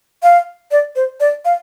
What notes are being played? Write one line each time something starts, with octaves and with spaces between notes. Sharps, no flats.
F5
D5
C5
D5
F5